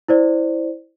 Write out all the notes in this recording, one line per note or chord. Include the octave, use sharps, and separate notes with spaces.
E4 C5 D5